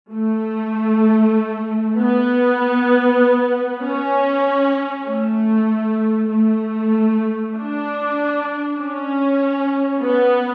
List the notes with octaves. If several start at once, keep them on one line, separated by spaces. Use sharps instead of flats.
A3
B3
C#4
A3
A3
D4
C#4
B3